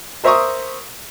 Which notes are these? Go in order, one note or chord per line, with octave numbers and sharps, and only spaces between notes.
A#4 C5 E5 A#5 C#6 D#6